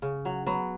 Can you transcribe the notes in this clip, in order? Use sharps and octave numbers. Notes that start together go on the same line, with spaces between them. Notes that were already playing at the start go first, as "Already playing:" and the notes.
C#3
F#3
F#3 B3